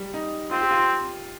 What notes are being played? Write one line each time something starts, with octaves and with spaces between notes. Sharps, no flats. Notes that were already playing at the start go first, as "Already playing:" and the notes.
Already playing: G3
D#4
C4 F4
G4
F4